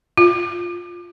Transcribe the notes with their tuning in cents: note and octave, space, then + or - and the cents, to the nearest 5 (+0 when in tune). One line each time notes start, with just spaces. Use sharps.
F4 +5